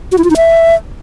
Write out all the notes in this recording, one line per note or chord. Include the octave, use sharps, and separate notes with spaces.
F#4
E4
F4
D#4
E5